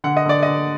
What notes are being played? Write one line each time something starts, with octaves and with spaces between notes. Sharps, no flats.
D3 F#5
D#5
D3 D5
D3 D#5